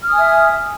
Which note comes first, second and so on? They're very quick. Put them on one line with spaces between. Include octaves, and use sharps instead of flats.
F6 D#6 G#5 E5